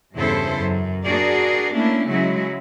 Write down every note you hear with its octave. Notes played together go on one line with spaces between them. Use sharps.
E2 G2 C#3 E4 A4 C5
F#2
D4 F#4 G#4 A#4 D5
A3 A#3 C#4 D4 E4
C#3 F#3 G#3 E4 F#4